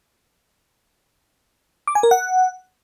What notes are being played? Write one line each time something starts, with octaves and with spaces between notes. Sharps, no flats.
D6
G#5
A#4
F#5